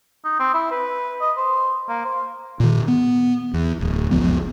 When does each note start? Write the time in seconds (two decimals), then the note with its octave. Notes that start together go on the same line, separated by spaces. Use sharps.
0.25 D#4
0.39 C4
0.54 E4
0.71 B4
1.21 D#5
1.37 C5
1.89 A#3
2.05 C5
2.60 A#2 D#3
2.88 B3
3.54 E2
3.80 D1
4.11 F#1 C#2 F3 B3